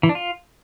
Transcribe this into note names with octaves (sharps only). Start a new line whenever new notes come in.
E3
D4
F4